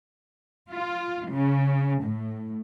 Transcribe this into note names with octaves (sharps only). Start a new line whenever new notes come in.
F4
C#3
A2